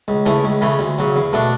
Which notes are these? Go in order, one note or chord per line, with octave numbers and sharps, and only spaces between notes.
C#2
C#3 E3 A3 E4
C#2
C#3 E3 A3
D2
C#3 F#3
E2
B2 A3 D4